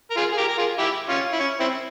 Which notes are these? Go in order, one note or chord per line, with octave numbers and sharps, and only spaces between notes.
A#4
F4 G#4
G#4
G4 A#4
A#4
F4 G#4
E4 G4
C#4 F4
E4
C#4
C4 E4